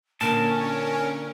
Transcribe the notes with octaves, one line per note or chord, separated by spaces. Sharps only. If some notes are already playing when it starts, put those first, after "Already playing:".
A#2 D3 C#4 A#4 A5